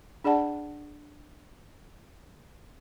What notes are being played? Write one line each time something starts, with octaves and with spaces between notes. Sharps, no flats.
D4 G#4 D5 F#5 A5